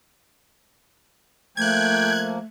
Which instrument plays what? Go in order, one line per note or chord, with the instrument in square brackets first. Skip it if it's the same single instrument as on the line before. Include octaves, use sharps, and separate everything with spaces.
[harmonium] F3 A#3 [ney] A3 [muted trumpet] G5 [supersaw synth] F#6 G#6